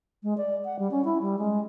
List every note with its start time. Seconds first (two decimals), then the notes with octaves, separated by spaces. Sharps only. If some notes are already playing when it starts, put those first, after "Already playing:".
0.23 G#3
0.37 D5
0.65 F#5
0.79 G3
0.91 C#4
1.05 E4
1.22 G3
1.38 G#3